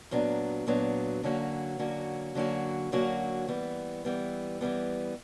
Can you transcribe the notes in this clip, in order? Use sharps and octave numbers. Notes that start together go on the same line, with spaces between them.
A#2 F#3 B3 D4
A#2 F#3 B3 D4
D3 F#3 A#3 C#4 F#4
D3 F#3 A#3 C#4 F#4
D3 F#3 A#3 C#4 F#4
D3 F#3 A#3 C#4 F#4
E3 G3 B3
E3 G3 B3
E3 G3 B3